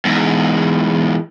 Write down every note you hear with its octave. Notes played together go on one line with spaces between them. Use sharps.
E2 G#2